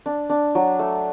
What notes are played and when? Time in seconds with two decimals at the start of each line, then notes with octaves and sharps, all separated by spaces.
0.06 D4
0.30 D4
0.55 F#3
0.79 A3